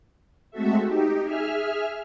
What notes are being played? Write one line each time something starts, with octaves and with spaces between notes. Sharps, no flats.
G#3 A3 C4 F#4 A4 E5
D#4 G4
G#4 E5 F6